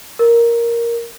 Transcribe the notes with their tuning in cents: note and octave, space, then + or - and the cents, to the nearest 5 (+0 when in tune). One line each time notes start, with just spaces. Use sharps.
A#4 +5